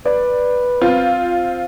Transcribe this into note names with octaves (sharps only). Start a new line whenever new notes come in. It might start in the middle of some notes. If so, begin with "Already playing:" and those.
B4 D5
C4 F4